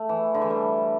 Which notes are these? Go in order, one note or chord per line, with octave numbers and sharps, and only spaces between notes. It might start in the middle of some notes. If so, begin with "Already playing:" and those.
Already playing: A3
E3
D3
E3
G3